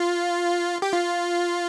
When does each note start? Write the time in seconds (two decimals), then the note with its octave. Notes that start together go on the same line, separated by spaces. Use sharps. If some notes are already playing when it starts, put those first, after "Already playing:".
Already playing: F4
0.82 G4
0.93 F4